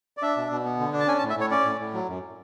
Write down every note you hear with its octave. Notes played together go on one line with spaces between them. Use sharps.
D5
D4 E5
B2
B2
B3
D3
D4
A5
C#4 G#5
A5
A2
E5
A2 C#5
C#4 D5
A2
A2
F#3
F#2